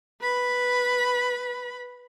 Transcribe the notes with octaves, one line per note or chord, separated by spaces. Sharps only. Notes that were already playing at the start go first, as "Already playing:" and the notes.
B4 B5